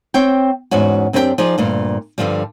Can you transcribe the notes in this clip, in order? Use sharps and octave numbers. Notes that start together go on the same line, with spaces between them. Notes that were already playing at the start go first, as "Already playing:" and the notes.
C4 C#5 G5
E2 G#2 C#4 F#4
F#2 C4 D4 G4 B4 G5
F3 D#4 G#4 D5
D2 G2 A#2
G2 D3 D#3 F3 G3